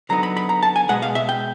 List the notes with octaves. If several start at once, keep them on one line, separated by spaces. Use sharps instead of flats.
D3 F#3 B3 D#4 A#5
B5
B5
A#5
A5
G#5
B2 G#3 B3 F#5
F5
E5
G5